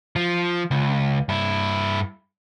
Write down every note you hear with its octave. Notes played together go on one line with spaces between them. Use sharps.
F3
C#2
G2 E4